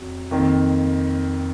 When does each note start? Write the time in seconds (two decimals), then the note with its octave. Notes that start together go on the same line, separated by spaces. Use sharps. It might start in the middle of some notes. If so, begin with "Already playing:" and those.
Already playing: F2 F#3
0.31 F2 D#3 A#3